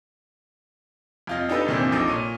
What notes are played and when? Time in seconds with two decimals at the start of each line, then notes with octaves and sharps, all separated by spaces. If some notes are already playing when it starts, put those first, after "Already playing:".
1.27 F2 F4 D#5
1.49 D4 D#4 G4 A4 B4
1.67 F2 A#2 D#3 E3 C4 D4
1.92 A#1 F3 D#4 A4 D6
2.08 A#2 C#5 D#7